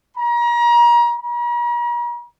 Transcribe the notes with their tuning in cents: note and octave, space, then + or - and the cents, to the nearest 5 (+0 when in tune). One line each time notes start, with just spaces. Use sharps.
A#5 +35
A#5 +45